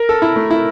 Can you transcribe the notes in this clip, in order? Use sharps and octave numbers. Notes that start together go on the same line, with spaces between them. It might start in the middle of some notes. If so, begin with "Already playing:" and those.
Already playing: A#4
A4
E4
A3
E4